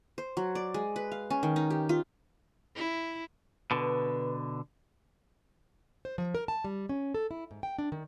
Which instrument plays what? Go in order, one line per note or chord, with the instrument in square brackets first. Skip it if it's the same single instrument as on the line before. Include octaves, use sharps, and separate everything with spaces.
[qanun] C5
F#3
D5
G#3
B4
F5
C#4
D#3
D#4
G4
F4
[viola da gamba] E4
[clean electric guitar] B2 D3 [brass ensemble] B4
[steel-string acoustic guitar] C5
F3
A#4
A5
G3
C#4
A4
E4
G#2
G5
D4
D#3